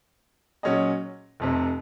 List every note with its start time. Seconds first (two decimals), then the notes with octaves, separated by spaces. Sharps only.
0.63 A#2 F#3 C#4 G#4 D#5
1.40 F1 F2 C3